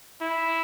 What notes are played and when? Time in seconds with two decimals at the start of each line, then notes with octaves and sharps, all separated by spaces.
0.22 E4